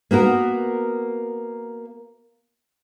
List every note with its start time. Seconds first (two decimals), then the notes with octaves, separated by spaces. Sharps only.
0.11 A#3 B3 F#4 A#4